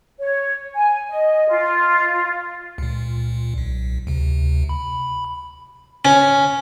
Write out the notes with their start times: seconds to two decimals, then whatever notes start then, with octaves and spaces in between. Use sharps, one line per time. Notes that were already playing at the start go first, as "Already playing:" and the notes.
0.19 C#5
0.74 G#5
1.09 D#5
1.49 F4
2.78 C#2 A#2
3.58 B1
4.07 D2 C3
4.69 B5
6.05 C#4